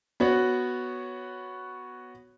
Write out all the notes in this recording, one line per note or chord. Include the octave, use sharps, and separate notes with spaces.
B3 F#4 C#5